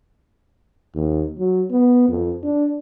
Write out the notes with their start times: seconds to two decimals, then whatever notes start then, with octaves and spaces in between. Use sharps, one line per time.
0.95 D#2
1.38 F#3
1.70 B3
2.08 F2
2.43 D4